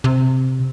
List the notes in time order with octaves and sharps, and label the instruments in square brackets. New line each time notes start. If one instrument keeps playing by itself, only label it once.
[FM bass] C3